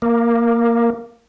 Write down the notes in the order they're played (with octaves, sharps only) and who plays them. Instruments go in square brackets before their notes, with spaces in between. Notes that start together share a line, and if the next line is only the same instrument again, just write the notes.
[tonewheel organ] A#3